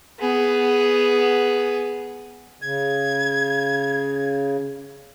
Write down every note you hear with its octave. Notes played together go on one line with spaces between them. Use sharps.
B3 G#4
C#3 G#6